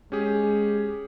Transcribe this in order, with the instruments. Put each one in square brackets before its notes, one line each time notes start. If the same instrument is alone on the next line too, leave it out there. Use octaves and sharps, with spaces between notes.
[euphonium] G#3 [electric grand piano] C#4 G4 G#4